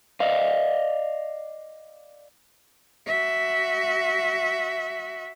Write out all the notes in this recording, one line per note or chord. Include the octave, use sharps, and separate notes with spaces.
D5 D#5 F5
F#4 E5